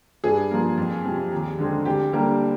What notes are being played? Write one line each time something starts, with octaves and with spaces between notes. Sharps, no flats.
G2 G#4
F3 A#3
F2
C3 F3
D#2
D3 G#3 C4
D2 G4
D3 G3 A#3